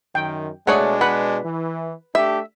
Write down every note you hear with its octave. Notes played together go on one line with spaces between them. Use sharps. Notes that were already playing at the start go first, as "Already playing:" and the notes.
F#2 D#3 G5
B2 G#3 A3 D4 G#4 C#5 D5 F#5
B4 F#5
E3
A3 D4 G4 E5